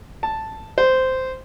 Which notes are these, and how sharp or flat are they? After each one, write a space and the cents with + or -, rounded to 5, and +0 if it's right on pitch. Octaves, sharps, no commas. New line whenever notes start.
A5 +0
C5 -10